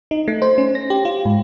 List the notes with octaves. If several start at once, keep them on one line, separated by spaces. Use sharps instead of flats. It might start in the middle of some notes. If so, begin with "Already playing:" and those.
D#4
A3
C5
C#4
A#6
G4
F4
G#2